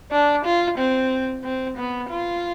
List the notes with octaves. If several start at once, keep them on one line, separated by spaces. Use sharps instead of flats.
D4
F4
C4
C4
B3
F4